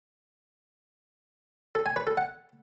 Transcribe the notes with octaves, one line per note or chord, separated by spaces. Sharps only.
A4
G#5
B4
A4
F#5